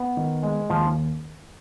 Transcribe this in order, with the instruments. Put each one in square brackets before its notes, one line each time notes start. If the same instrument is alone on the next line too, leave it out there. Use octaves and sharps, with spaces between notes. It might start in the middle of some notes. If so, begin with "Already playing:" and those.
Already playing: [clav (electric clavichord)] B3
[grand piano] D#3
G#3
[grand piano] D#2 [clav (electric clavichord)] F3